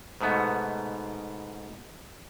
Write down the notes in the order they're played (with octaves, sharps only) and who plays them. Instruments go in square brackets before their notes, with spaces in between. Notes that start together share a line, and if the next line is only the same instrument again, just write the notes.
[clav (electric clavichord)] G#2 B2 A3 B3